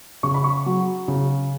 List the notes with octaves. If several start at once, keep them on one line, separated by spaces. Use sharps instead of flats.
C#3 C#6
B5
C#6
F#3
C#3